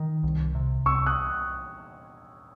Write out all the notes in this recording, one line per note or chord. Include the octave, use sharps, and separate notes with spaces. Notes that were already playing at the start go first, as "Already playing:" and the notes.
Already playing: D#3
C2
C3
C2 C#6 E6
D#6 F#6